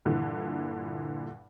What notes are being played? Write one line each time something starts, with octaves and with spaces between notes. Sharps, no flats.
G2 A#2 D3 E3